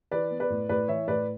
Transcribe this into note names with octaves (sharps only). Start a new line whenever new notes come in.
E3 B4 D5
B3
B4 D5
A2
A2 B4 D5
E3 C#5 E5
A2 B4 D5